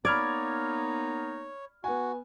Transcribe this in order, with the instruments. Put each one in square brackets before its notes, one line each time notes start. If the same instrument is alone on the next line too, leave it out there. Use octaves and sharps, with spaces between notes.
[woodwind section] A#3 B3 D#4 [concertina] C#5 [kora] D5 [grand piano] B5 F6 G#6
[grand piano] B3 G#5 [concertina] F#4